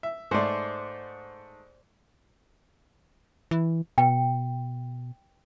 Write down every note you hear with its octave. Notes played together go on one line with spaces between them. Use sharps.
E5
G#2 A3 C5 D5
E3
B2 G5